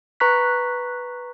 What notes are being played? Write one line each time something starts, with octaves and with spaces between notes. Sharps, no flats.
B4 A#5 C#6 F#6 B6